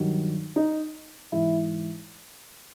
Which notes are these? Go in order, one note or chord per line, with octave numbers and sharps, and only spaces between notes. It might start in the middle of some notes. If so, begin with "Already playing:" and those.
Already playing: G2 D#3 F#3
D#4
G#2 E3 E4